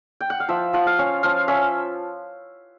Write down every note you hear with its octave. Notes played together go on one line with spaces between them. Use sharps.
G5
F#5
F5
F3 E5
F3 F#5
F5
C#4
F3 F5
C#4 E5